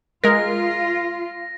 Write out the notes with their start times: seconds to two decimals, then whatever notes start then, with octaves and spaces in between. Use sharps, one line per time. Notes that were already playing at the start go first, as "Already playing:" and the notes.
0.24 G#3 F4 A#4 A#6